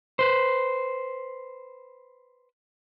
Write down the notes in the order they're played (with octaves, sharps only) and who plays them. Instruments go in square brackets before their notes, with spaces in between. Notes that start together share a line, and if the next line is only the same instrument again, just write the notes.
[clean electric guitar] B4 C5